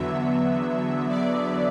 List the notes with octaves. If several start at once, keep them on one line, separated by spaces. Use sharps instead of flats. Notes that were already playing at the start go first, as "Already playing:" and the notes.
Already playing: E2 D3 F#3 B3 E5
D5